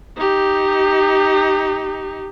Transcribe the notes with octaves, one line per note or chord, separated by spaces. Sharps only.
D#4 G4